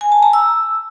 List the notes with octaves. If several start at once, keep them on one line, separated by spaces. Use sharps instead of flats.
G#5
A5
A#5
E6